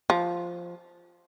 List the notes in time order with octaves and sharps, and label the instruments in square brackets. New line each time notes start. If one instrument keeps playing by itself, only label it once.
[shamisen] F3